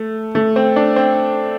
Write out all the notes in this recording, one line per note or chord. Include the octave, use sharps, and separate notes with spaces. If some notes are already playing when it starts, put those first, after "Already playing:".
Already playing: A3
A3
C4
D4
C4